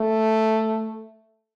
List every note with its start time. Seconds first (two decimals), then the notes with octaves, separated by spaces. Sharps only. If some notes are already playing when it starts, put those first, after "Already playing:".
Already playing: A3